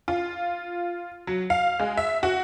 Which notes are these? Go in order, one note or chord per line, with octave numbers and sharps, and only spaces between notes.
F4
F#3
F5
G#3
E5
F#4